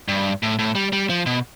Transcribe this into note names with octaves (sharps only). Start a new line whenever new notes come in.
G2
A2
A2
G3
G3
F3
B2